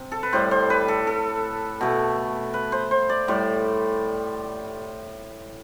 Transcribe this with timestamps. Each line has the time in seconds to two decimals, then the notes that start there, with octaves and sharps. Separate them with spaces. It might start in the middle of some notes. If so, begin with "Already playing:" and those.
Already playing: C3
0.12 A4
0.23 B4
0.33 A2 G3 C5
0.51 C5
0.70 B4
0.88 A4
1.07 A4
1.81 B2 A3
2.54 B4
2.72 C5
2.91 C5
3.09 D5
3.28 A2 G3 C5